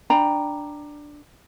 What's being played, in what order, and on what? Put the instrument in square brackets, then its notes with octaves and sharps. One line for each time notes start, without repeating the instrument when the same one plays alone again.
[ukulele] D4 G5 A#5 B5